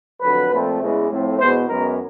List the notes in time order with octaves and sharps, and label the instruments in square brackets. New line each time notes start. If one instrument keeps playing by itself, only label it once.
[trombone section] F2 D3 F#3 B4
A#2 F3 A3 C4
E2 C#3 E3 G#3
A2 F3 A3 C4
E2 B2 G#3 B3 C5
F#2 D#3 G#3 B3 A#4